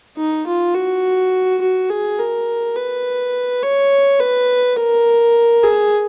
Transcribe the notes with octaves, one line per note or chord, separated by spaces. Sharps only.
D#4
F4
F#4
F#4
G#4
A#4
B4
C#5
B4
A#4
G#4